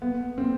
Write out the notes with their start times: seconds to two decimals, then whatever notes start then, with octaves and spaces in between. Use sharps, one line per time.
0.02 B3
0.38 C4